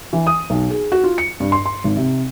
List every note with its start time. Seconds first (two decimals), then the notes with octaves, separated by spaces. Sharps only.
0.13 E3
0.27 D#6
0.50 B1
0.70 G#4
0.92 F#4
1.04 F4
1.18 C#7
1.40 G2
1.52 C6
1.66 C6
1.84 G#1
1.97 C3